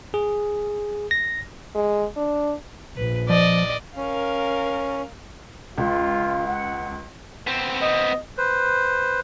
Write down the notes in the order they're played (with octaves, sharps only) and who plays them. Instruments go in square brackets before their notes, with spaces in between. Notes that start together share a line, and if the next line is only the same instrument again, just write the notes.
[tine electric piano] G#4
A#6
[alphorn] G#3
D4
[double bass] A#1 [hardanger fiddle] B4
[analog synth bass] F3 [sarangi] D5 [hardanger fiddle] D#5
[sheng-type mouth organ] C#4 [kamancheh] A#4 F5
[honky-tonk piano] C#2 [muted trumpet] F4
[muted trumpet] F#5
[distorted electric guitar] B3 C4
[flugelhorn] D#5
[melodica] B4 C5